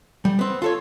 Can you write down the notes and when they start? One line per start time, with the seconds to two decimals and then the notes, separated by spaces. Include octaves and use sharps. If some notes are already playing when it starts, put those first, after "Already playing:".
0.25 G3
0.39 B3 C4
0.62 F4 A4 C#5